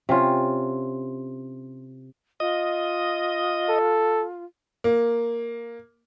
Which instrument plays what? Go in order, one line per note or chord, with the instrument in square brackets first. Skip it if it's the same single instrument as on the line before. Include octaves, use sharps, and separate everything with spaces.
[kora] C3 C#4 F4
[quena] F4 [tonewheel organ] D#5
[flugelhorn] A4
[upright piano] A#3